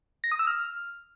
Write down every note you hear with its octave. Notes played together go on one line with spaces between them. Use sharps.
A#6
D#6
E6
F6